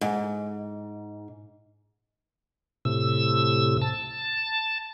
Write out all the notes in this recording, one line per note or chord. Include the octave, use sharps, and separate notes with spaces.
G#2
A2 C3 E6
A5